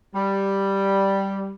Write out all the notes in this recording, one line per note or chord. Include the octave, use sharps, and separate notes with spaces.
G3